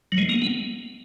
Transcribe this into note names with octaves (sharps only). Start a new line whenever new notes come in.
F#3
G#3
A#3
B3